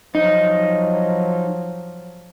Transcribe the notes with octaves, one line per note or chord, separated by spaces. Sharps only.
F3 F#3 D#4